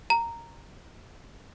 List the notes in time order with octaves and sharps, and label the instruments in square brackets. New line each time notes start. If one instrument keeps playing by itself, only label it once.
[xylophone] A#5